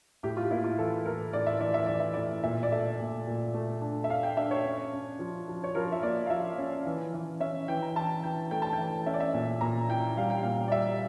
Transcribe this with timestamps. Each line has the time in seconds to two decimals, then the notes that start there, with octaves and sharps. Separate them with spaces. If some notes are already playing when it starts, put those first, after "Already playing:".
0.23 A2 G4
0.37 F4
0.50 A#3 E4
0.64 F4
0.79 E3 A4
1.05 A2 A#4
1.33 A2 D5
1.46 E5
1.60 E3 D5
1.74 E5
1.86 E3 D5
2.00 E5
2.14 A2 D5
2.43 A#2 E5
2.63 D5
2.72 A3 E5
3.00 A#2
3.27 A#2
3.54 A3
3.81 D4
4.04 E5
4.09 A3 F5
4.23 G5
4.37 D4 E5
4.51 C#5
4.65 C#4
4.93 C#4
5.19 F3
5.48 F3
5.64 C#5
5.75 F3 A#4
5.92 E5
6.03 A#3 D5
6.26 F5
6.30 F3 E5
6.58 C#4
6.86 E3
7.14 E3
7.40 C#4 E5
7.68 E3 G5
7.82 A#5
7.96 E3 A5
8.23 E3 G5
8.51 A3 G5
8.62 A5
8.73 G5
8.78 E3
9.06 C#4 E5
9.14 D5
9.20 E5
9.34 A#2
9.61 A#2 A#5
9.89 E4 G5
10.17 G3 F5
10.30 G5
10.42 A#2 F5
10.68 D5
10.71 G3 E5